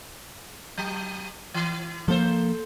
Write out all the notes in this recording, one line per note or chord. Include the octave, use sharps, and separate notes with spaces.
F#3
E3
F3 A#3 A4 C5